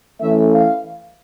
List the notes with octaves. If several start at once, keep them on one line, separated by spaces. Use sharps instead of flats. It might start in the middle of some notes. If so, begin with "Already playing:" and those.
E3 A3 C#4 E5
F5